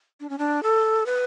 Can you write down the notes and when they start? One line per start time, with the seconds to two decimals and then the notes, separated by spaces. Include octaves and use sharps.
0.20 D4
0.29 C#4
0.38 D4
0.63 A4
1.06 B4